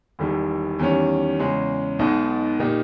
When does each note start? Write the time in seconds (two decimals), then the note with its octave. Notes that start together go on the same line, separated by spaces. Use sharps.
0.19 E1 E2 D#3 G3
0.79 E2 D#3 G3 C#4
1.39 E2 C#3 G#3 C#4
1.99 B1 B2 G#3 D#4
2.59 A#2 A#3 D#4 G4